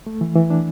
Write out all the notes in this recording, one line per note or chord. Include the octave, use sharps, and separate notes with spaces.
A3
E3
E3
D4